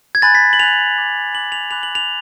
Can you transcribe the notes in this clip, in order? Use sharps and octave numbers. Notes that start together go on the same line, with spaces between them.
G#6
G#5 B5 F#6 A6
B6
F#7
G#5 B5 F#6 F7
B5 D6 F#6
B5 D6 F#6 F#7
F7
G#5 B5 D6 F#6 F7
F#7
F7